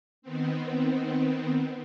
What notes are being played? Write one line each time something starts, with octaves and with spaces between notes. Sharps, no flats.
D#3 B3 C4